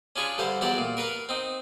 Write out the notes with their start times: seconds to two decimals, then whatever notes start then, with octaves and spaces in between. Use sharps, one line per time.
0.16 C#4 D4 F4 G#4 B5 C#6
0.38 G2 D3 C5 F5
0.61 E2 F#3 G4 D5 F#5
0.78 A#2
0.97 A#4 B4 F5 A#5
1.29 C4 D#4